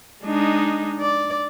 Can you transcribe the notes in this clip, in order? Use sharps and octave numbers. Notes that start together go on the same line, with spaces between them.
G#3 D4 D#4
D5